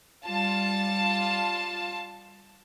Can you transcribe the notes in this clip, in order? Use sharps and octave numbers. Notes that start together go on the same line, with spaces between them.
G3 F4 A5